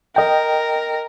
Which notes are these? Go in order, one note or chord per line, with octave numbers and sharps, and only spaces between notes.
A#4 D#5 G5